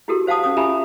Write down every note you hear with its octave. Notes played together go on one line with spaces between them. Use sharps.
E4 F#4 G4 A4 A#4
C5 F5 F#5 A5 D#6
C#4 D#6
F4 G4 E5 G#5 A#5 B5